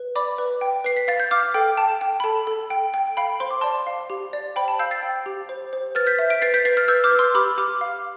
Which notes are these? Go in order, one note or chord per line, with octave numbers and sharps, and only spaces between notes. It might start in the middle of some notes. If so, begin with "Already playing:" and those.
Already playing: B4
D5 B5 D6
B4
G5
B4 C7
B6
F5 A6
G6
F5 D6 F6
A4 G5
G5 A5
G5
B5
A4 A5
A4
G5
G5
F5 G5 B5
C5 C6
D6
D5 A5 C6
F5
G4
D5
C5 G5 B5
A5
F5 E6 G6
A6 C7
G5
G4
C5
C5
B4 F6 A6
G6 B6
E5
B6 D7
B4 A6 C7
G6 B6
B4 A6 C7
F6 A6
B4 E6 G6
D6 F6
B4
C6 E6
G4 B5 D6
G4 D6 F6
F5